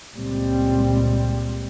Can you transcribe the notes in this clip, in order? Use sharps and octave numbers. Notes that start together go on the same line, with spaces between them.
C#2 A#2 G3 C4